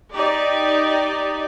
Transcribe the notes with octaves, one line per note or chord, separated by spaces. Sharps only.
D#4 G4 D5